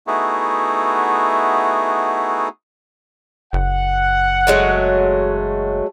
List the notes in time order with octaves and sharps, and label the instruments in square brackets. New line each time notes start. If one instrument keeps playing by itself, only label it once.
[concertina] A3 B3 D#4 E4 F#4 G#4
[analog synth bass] F#1 [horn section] F#5
[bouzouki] F#3 G#3 A3